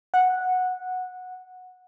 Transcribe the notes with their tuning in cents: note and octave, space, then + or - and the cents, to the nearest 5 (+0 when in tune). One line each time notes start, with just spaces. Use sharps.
F#5 -10